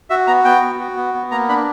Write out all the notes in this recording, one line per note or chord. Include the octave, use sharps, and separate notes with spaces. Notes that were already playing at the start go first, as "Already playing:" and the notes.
F#4 E5
B3 A#5
B3 G5
F#4
F#4
B3
B3
A#3 A#5
D4 B5